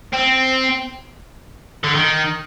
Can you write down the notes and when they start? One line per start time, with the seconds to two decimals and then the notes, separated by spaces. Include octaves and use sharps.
0.14 C4
1.84 D3
1.95 D#3